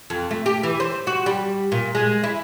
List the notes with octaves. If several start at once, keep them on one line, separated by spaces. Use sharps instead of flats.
F2
A3
G4
E3
C5
F#4
G3
A#2
G#3
E4